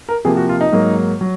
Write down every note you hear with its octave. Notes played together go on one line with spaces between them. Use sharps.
A#4
C3 F3 A#3 G#4
F#4
F4
D#4
G#2 F#3 A#3
F#3